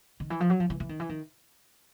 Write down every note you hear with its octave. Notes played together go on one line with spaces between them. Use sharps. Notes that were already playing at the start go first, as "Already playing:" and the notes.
D#3
E3
F3
F#3
F3
E3
E3
D#3
E3
D#3